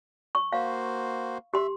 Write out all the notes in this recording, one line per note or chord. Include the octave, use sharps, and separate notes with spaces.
C#6
A#3 F#4 C5 F5
G4 E5 C6